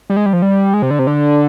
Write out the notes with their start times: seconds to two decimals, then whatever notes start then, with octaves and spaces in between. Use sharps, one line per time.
0.10 G3
0.17 G#3
0.26 G3
0.33 F3
0.42 G3
0.74 G#3
0.82 C3
0.91 D3
0.99 C3
1.07 D3